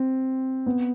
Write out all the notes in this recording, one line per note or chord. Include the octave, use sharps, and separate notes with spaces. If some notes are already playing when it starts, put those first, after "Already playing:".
Already playing: C4
B3